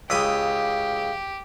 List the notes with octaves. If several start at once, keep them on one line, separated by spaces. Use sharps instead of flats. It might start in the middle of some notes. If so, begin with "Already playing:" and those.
C#2 G4 F5 B5 D#6